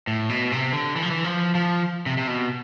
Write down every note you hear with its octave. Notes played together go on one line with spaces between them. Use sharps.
A2
B2
C3
D3
E3
F3
E3
F3
F3
C3
C3
B2